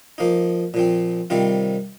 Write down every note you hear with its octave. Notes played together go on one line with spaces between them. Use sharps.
F3 A#3 D#4
A#2 F3 C4
C3 D#3 G3 C4 F4